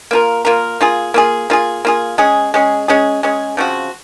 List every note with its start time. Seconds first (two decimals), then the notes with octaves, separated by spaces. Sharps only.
0.11 A#3 F4 A#4
0.45 A#3 F4 A#4
0.81 A#3 F4 G#4
1.14 A#3 F4 G#4
1.50 A#3 F4 G#4
1.85 A#3 F4 G#4
2.18 G#3 C#4 G#4
2.54 G#3 C#4 G#4
2.88 G#3 C#4 G#4
3.23 G#3 C#4 G#4
3.57 C#3 F3 C4 F#4